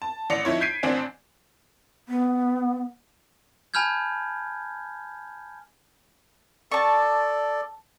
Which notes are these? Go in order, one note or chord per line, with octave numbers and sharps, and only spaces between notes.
A5
A1 D5 A#6 C#7 F7
F2 D#4 E4 C#5
G6 G#6 B6 C7 D7 D#7
A1 C4 D4 G#5
B3
G#5 A5 B5 F6 G6 G#6
A4 D5 A5 C#6